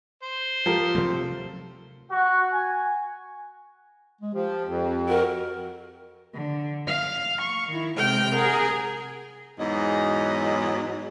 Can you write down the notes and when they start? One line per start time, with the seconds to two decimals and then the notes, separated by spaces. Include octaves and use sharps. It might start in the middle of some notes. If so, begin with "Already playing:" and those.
0.23 C5
0.66 F3 G4 A4 A#4
0.95 C3 F#3 A3
2.11 F#4
2.52 G#5
4.21 G#3
4.34 F3 G4
4.66 F2
5.08 F#4 A#4
6.33 D3
6.87 F5
7.40 C#6
7.68 D#3 E4
7.97 C3 G#3 G5 F6 G6
8.34 G#4 A#4 F#5 A#5
9.58 E2 G#2 F#3 D#5